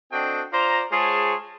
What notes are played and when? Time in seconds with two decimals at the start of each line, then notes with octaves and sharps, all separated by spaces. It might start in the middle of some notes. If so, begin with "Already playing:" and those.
0.12 C4 D4 F#4 A4 D#5 G5
0.52 F4 C5 D5 A#5
0.92 G#3 F4 G#4 C5 C#5 A5